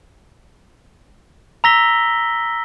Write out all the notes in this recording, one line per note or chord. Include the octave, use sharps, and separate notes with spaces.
A#5 E6 A#6 B6 G7